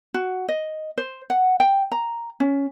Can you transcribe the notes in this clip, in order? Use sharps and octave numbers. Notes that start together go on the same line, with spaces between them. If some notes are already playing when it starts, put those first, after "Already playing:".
F#4
D#5
C5
F#5
G5
A#5
C#4